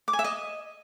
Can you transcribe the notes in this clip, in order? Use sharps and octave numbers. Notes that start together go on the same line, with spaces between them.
D6
G#5
E5
D#5